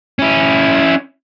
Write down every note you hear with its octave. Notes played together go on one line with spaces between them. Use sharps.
C#4 E4